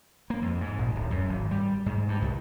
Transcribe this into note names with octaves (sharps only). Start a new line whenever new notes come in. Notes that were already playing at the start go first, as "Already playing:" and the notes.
A#3
F2
G#2
A#1
D1
F#2
G#1
G3
G#2
G2
C2